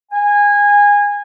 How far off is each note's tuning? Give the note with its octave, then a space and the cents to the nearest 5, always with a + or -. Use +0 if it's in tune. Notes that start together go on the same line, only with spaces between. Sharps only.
G#5 -20